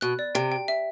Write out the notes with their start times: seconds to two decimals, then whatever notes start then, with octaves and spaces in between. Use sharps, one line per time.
0.01 B2 F#6
0.19 D5
0.35 C3 G5
0.52 G5
0.68 E5